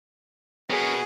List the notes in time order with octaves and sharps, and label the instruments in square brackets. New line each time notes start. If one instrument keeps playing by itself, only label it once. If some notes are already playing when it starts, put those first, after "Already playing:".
[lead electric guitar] B3 F#4 [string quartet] G#4 [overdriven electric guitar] A#4 C#5